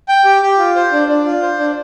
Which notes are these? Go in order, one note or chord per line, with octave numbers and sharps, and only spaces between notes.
G5
G4
G4
F4
C5
D4
D4
F4
C5
D4